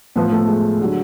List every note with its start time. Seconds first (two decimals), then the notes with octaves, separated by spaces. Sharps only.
0.16 A2 F3 B3
0.32 A3
0.48 G#3
0.82 D3 F#3